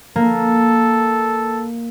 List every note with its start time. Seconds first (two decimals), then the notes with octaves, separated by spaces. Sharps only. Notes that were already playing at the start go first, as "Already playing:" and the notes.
0.16 A#3 A4